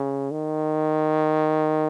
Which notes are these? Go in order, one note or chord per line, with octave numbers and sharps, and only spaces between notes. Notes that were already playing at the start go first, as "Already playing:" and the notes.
Already playing: C#3
D#3